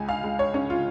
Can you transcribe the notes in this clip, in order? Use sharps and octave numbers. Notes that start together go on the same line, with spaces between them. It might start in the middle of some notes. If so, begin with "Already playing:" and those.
Already playing: C#2 G#5
F5
C#2
C#5
C#4 C#5
F4